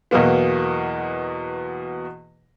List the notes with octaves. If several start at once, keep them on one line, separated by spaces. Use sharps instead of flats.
E2 B2 F#3 A#3 B3